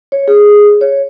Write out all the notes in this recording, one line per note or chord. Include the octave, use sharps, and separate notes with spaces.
C#5
G#4
C#5